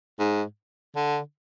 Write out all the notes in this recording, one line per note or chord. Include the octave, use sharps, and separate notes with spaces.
G#2
D3